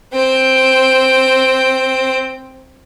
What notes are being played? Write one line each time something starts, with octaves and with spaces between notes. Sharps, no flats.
C4 G5